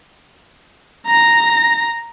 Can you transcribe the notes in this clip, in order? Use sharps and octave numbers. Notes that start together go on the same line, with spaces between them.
A#5 A#6